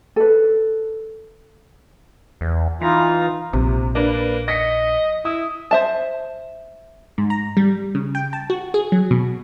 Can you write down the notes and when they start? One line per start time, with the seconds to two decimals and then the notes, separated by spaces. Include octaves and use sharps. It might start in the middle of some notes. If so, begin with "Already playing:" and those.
0.16 A4 B4
2.41 E2
2.82 E3 D#4 F4 A#5
3.53 A#1 C3
3.95 A#3 D4 B4
4.48 D#5 A#6 B6 C#7
5.25 E4 D#6
5.71 C5 E5 A5
7.18 G#2
7.30 A#5
7.57 G3
7.95 C#3
8.15 G5
8.33 A5
8.50 F#4
8.74 G#4
8.92 F#3
9.11 B2